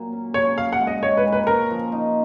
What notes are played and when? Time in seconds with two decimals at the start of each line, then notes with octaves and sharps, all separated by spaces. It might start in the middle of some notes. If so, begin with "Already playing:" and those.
Already playing: A#2 F#3 A#3
0.12 C#4
0.34 C#3 C#5
0.57 C#3 F5
0.73 F#5
0.80 G#3
0.87 D#5
1.02 G#3 C#5
1.17 B4
1.25 A#2
1.33 B4
1.47 C#4 A#4
1.70 F3
1.92 D#4